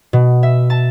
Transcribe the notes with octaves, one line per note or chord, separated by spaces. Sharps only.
B2
E5
A5